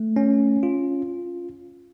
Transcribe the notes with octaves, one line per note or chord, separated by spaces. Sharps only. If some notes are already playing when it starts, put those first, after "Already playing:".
Already playing: A3
C#4
F4